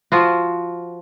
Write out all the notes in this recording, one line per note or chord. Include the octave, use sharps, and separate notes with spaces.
F3 F4 F#4